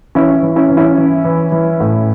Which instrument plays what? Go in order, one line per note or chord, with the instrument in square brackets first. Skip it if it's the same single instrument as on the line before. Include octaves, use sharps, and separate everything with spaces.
[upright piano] E3 C#4 E4
E3
C#4 E4
E3
C#4 E4
E3
E3
E3
A2